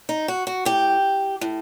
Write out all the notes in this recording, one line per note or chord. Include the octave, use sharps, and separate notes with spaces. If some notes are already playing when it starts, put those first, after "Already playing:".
D#4
F#4
F#4
A2 G4
A2